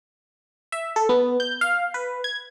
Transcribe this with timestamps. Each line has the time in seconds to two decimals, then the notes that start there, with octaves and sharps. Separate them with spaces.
0.72 E5
0.96 A4
1.09 B3
1.40 G6
1.61 F5
1.94 B4
2.24 G#6